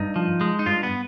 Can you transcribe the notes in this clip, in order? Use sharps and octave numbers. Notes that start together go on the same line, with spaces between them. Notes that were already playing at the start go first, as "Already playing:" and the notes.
Already playing: G2 D#4
F3
G#3
D#4
G2 F4
B3